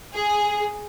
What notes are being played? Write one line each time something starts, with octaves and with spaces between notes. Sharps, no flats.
G#4